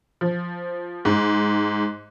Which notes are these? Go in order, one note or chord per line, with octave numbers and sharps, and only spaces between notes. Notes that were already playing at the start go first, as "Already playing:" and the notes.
F3
G#2